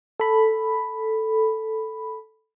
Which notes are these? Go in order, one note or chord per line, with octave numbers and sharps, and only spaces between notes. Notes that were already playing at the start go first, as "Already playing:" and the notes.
A4 B5